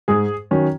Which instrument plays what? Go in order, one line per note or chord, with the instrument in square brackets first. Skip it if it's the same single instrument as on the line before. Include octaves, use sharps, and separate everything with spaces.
[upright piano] G#2 G#4
D#3 F#3 C#4